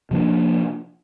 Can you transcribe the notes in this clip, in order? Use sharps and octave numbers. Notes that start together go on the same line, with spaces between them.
C3 F3 A#3 D4